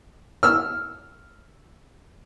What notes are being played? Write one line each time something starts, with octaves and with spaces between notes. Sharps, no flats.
E6 F6